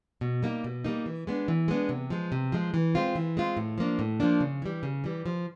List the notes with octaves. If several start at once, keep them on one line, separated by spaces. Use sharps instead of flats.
B2
G3 A#3 D#4
B2
G3 A#3 D#4
E3
G#3 B3 D4
E3
G#3 B3 D4
C3
F3 G#3
C3
F3 G#3
E3
G#3 C4 F4
E3
G#3 C4 F4
A2
F3 A#3 D4
A2
F3 A#3 D4
C#3
E3 G3
C#3
E3 G3
F3